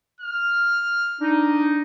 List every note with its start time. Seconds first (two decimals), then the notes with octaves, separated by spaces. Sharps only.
0.21 F6
1.20 D4 D#4